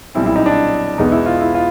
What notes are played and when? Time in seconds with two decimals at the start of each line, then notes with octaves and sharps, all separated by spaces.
0.15 B1 A#2 G3 C4 E4
0.26 E4
0.36 D#4
0.46 D4
0.98 E2 B2 G#3 B3 D#4
1.12 E4
1.26 F4
1.41 E4
1.55 F4